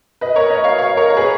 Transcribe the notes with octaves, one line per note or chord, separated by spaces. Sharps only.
B4 D#5
A#4 C#5
B4 D#5
C#5 F5
C#5 F5
A#4 C#5
C#5
G#4 B4